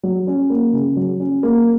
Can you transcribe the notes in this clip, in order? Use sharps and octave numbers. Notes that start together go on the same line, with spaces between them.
F#3
C#4
A#3
C#3
F#3
C#4
A#3